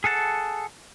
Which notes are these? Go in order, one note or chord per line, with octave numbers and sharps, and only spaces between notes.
G#4 A4 F#5 A5